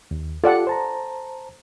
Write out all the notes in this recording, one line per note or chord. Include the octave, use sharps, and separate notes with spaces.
D#2
F4 G4 A4 D5 F#5
C5 A5 A#5